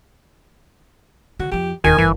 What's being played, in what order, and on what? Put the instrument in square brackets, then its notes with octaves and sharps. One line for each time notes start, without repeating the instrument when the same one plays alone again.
[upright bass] D3 [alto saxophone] F#4
[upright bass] F2 F3 [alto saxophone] G4
[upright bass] D1 E2 [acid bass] D#3 [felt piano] A#4 [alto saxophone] G#5
[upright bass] F#1 E4 [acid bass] E3